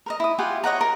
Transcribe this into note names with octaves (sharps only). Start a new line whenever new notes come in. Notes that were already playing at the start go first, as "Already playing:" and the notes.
A#4 B4 D#5
E4 D#6
F4 G4 F#5 G#5
C#5 D#5 F#5 A#5
A#4